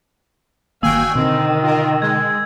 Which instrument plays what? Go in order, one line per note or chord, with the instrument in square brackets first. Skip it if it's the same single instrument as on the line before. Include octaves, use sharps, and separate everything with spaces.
[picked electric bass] G1 D#3 A#3 [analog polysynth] F#4 G5 G#5 [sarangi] F5 [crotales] E6
[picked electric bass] B2 D3 [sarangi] D#3 [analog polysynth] C4
[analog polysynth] F4 A#4
[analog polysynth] G#3 [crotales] G#6